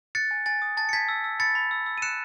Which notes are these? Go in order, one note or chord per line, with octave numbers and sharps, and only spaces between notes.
F#6 A6 C#7
G#5
G#5 A6
D#6
A5 A6
C#7
A5 G#6 B6
E6
E6
B5 A6 C#7
B5
E6
E6
D#7
F#6 C#7 E7